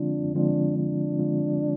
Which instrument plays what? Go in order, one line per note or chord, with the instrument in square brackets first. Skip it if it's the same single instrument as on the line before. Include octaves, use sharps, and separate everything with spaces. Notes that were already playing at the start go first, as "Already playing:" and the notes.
Already playing: [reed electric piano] D3 F3 G#3 C4 F4 [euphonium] D4
[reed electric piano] D3 F3 G#3 C4 F4 [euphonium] D4
[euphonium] D4
[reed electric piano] D3 F3 G#3 C4 F4